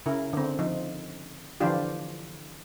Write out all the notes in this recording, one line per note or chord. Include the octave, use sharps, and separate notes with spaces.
C#3 E4 A#4
D3 C4
F3 D#4
D3 E3 F3 D4 F4 G4